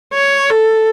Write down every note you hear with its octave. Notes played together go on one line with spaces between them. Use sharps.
C#5
A4